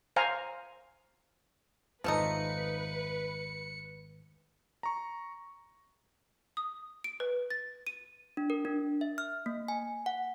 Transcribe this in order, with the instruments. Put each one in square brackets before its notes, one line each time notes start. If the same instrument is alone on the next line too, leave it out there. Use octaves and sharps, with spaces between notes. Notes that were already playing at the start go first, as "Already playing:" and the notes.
[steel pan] C5 F5 G#5 A#5
[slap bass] G#1 F2 [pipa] F3 A3 D#4 [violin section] B4 [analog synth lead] C#7
[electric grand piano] A#5 C#6
[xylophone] D#6
D7
B4
A6
D#7
[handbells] D4
A#4
D4
E5
F6
A#3
G#5
F#5